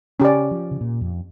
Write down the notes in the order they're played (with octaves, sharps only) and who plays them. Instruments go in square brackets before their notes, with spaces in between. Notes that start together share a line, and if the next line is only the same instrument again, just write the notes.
[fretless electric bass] C#3 [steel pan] C#4 G4 D5
[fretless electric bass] F3
C#3
A#2
F2